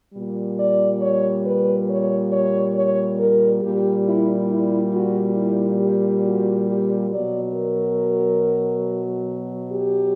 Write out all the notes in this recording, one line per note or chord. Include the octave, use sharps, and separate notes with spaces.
A#2 G3
D5
C#5
B4
C#5
C#5
C#5
A#4
A#2 G3 G4
E4
E4
F#4
E4
G4
F#4
G4
B2 F#3 D5
A#4
G4